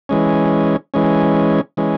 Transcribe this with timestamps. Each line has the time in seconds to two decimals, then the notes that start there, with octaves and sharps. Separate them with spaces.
0.09 E3 G#3 C#4
0.94 E3 G#3 C#4
1.77 E3 G#3 C#4